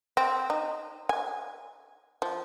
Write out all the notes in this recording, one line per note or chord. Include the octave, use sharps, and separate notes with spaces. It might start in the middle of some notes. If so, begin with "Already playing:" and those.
C4
D#4
G#5
F3